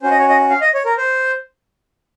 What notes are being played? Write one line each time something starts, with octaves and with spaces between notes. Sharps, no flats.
C#4 F#4 C5
D#5
C#5
D#5
F5
D#5
C#5
A#4
C5